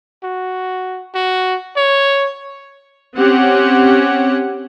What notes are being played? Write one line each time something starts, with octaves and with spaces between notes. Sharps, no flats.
F#4
F#4
C#5
C4 C#4 G4 F#5